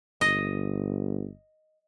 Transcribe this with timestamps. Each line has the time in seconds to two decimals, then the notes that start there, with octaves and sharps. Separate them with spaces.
0.21 G1 D#5